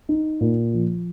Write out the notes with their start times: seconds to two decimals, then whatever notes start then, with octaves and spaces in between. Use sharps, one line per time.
0.09 D#4
0.41 A#2
0.73 F3